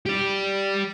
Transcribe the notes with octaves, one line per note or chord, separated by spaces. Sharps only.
G4 D5